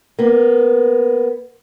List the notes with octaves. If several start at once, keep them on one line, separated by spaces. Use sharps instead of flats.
A#3 B3